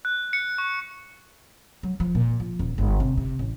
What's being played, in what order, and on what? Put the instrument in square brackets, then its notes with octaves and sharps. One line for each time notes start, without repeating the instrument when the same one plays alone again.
[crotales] F#6
C#7
C#6
[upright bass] F#3
F3
A#2
F3
D#1
G1
C3
C3
A1